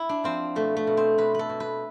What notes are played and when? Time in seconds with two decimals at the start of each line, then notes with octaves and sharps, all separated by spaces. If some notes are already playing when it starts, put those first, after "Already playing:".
Already playing: E4
0.09 D4
0.24 F3 C4
0.55 B2 A3
0.76 A3
0.87 B2
0.97 C4
1.18 B2 B4
1.34 A4 B4
1.49 B2
1.60 B4